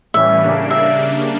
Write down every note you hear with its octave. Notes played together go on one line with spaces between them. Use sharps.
A2 E3 G3 C#4 E5
C#3 G3 A#3 D4
E5